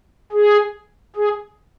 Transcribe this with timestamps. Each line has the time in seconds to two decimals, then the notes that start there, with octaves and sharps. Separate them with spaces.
0.32 G#4
1.16 G#4